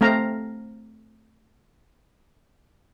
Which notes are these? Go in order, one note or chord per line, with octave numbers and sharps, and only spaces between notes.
A3 C4 F5 A#5